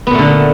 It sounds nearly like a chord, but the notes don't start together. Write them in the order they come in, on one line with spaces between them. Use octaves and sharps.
B3 A#2 A3 D3